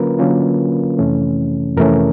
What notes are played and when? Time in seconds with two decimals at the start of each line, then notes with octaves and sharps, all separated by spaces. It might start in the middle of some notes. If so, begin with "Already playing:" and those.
Already playing: D3 F#3 A#3 C#4 F4 A#4 B4
0.19 D3 F#3 A#3 C#4 F4
0.99 F2 C3 E3 A3 C#4
1.77 F2 C3 E3 A3 C#4 A#4